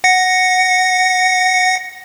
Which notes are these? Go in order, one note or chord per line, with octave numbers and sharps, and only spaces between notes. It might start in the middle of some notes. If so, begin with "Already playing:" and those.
F#5 A#6 C#7